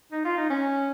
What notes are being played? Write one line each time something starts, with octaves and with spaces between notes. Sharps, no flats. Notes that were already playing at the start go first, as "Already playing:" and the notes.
D#4
F4
D#4
C#4